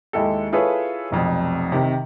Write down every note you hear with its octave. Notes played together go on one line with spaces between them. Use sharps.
D#2 G#3 E4 G4 A4
E4 F4 G#4 A4 B4 C#5
F1 B1 F2
C3 D#3 G4